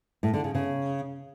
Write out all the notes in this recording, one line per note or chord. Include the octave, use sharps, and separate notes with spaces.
A2
D3
C#3
C#3